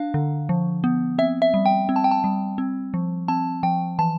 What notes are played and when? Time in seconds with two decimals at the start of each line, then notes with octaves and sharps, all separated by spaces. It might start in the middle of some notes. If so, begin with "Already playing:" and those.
Already playing: D4 F5
0.14 D3
0.49 F3
0.84 B3
1.18 C4 E5
1.42 E5
1.54 G3
1.66 G5
1.89 C4
1.96 A5
2.04 G5
2.11 A5
2.24 G3
2.58 C4
2.94 F3
3.28 C4 A5
3.63 F3 G5
3.99 E3 A5